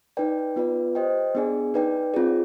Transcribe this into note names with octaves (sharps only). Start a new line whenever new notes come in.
D#4 B4 D5 G5
B3 F4 B4 D5
G4 C5 D#5 G5
B3 D4 G#4 D5 G#5
D#4 B4 D5 G5
C4 F4 G#4 D5